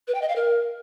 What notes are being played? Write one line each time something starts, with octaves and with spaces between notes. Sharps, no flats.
B4
G5
D#5
F5
A#4